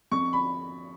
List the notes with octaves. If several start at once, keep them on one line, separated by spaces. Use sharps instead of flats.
F2 C#6
B5